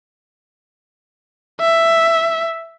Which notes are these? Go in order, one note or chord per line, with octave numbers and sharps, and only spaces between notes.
E5